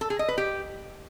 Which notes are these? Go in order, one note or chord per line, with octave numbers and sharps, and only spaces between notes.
A4
G#4
D#5
B4
G4